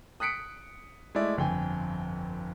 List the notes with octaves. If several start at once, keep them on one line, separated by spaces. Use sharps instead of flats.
D#6 F#6 B6 C#7 D7
G#3 A3 E4 D5
G1 F2 G5 G#5